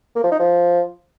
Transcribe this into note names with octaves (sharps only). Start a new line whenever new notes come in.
A#3
F3
D#4
F3